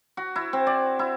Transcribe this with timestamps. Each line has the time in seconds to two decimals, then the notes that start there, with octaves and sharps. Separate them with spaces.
0.17 F#4
0.36 E4
0.53 C4
0.67 D5
0.99 E4